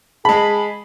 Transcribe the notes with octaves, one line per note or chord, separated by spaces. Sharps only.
G#3 G#4 A5 B5